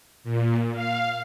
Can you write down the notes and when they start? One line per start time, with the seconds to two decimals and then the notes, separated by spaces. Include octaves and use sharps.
0.24 A#2
0.73 F5